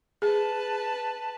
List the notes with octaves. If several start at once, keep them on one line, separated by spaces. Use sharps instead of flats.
G#4 B4 A5